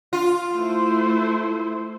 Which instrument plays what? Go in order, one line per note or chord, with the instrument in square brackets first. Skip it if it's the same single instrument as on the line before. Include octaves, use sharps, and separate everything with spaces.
[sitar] F4
[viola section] A3 E4 C5